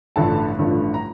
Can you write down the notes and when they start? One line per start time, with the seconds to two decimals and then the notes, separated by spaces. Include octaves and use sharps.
0.16 A1 G2 D3 F3 A3 A4 A5
0.59 A1 G2 D3 F3 A3
0.94 A#5